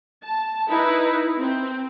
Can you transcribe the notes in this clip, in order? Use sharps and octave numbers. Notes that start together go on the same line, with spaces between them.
A5
D#4 E4 B4
C4